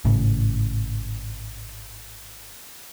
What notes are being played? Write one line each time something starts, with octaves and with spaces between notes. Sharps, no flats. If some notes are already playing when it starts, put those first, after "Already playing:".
G#1 A2 C#3